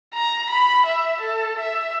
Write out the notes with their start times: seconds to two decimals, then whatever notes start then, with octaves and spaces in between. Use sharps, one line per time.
0.14 A#5
0.50 B5
0.86 E5
1.21 A4
1.59 E5